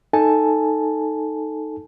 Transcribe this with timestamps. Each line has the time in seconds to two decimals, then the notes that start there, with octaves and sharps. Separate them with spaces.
0.13 D#4 A4 G#5 A5